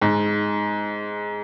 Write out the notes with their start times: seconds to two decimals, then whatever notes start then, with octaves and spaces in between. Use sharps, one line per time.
0.01 G#2